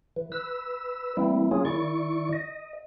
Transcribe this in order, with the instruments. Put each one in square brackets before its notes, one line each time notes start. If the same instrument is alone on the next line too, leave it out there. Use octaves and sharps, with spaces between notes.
[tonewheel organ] E3
B4 E6
E3 G3 A3 A#3 C4 E4
F#3 A#3 C#4 F4 G#4
D#3 E4 D5 C#6
D#5